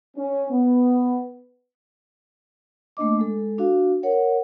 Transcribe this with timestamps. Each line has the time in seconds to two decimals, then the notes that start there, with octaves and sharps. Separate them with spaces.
0.17 C#4
0.51 B3
2.97 A3 A#3 D4 D#5 D6
3.19 G#3 A4
3.58 D4 F#4 F5
4.03 A#4 C#5 F#5